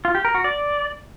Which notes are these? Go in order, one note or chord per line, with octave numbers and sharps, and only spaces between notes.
F4
G4
A#4
F#4
D5